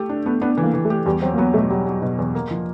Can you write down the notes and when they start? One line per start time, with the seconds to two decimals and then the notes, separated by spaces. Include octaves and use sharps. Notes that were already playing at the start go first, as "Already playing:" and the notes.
Already playing: A3 G4
0.09 D4
0.26 A3 B3
0.42 B3 D4
0.57 E3
0.63 A#3
0.74 E3
0.85 A3
0.90 G4
1.06 E2 G3
1.22 F#3 C4
1.34 A#3
1.38 F#3 B3
1.54 B2 A3
1.70 F#3 G3
1.87 F#3
2.02 B2
2.19 E2
2.35 A#3
2.51 F3